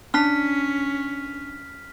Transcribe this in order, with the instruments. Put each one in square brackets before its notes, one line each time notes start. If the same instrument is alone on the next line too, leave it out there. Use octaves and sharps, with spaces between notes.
[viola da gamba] C#4 [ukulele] D4 [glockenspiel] F6 B6